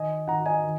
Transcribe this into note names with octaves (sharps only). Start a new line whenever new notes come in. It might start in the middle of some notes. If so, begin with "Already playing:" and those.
Already playing: D#3 D#5 G#5
D#3 F#5 A#5
D#5 G#5
D#3